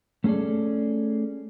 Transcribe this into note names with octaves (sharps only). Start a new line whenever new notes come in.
A3 C#4 G#4 A4 D5